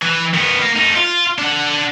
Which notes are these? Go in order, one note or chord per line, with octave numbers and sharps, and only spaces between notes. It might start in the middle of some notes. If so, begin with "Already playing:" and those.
E3
D#3 B3
A#3
A3 D#4
F4
D4 F#5